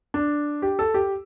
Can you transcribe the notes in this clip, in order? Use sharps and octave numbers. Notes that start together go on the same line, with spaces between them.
D4
G4
A4
G4